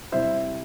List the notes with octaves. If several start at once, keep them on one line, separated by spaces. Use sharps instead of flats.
C3 G3 C4 E4 C5 E5